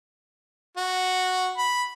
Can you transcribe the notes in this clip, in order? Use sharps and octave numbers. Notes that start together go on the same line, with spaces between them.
F#4
B5